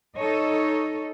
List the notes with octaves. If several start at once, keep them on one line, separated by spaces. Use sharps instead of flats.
D#4 A4 C#5 D#5